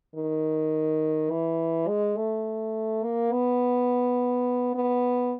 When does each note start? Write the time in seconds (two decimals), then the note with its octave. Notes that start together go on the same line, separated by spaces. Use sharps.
0.16 D#3
1.30 E3
1.88 G#3
2.17 A3
3.03 A#3
3.32 B3
4.75 B3